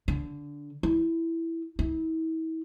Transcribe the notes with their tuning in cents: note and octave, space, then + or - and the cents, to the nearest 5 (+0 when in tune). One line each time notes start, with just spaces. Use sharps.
D3 -15
E4 +0
E4 -40